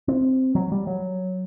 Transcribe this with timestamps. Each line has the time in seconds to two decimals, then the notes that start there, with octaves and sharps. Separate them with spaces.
0.08 C4
0.55 F#3
0.72 G3
0.87 F#3